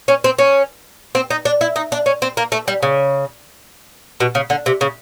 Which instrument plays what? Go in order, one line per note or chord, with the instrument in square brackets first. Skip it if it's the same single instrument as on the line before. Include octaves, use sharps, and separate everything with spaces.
[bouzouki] C#4
C4
C#4
C4
D#4
D4
E4
D#4
D4
C#4
C4
A#3
A3
G3
C#3
B2
C#3
D3
C3
C#3